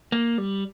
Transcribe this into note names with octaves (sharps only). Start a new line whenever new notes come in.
A#3
G3